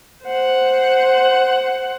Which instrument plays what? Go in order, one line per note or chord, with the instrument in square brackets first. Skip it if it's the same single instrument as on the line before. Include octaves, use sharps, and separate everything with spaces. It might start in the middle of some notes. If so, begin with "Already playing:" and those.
[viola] C5 F#5